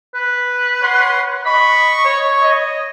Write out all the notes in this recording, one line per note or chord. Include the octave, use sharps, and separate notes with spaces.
B4
C#5 F#5 C6
D#5 B5 C#6
C#5
D#5